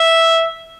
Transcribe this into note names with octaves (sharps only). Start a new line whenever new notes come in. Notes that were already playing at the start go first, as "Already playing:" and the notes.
Already playing: E5